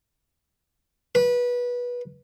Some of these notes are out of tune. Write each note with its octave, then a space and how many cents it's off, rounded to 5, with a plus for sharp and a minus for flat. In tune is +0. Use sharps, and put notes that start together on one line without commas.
B4 -20